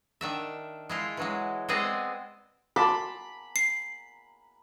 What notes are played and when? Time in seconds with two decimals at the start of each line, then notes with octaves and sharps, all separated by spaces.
0.21 D#3 D4 E5
0.89 G#3 E4 F4
1.17 E3 F#3 G#3
1.69 G#3 B3 C4 G#4 D5 D#5
2.76 A5 B5 C6 D6
3.56 C7